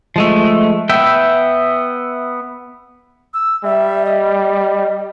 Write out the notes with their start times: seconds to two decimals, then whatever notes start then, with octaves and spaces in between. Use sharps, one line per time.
0.16 F3 G#3 A3
0.89 B3 E5 G5
3.34 E6
3.64 G3 E5
4.05 D#5